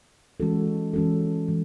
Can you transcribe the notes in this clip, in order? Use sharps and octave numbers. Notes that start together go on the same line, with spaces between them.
E3 G#3 C#4 F#4 A4
E3 G#3 C#4 F#4 A4
E3 G#3